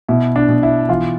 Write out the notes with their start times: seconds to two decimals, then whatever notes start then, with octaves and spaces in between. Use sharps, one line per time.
0.09 B2 E4
0.36 D4
0.49 B2
0.63 E4
0.89 E3 F4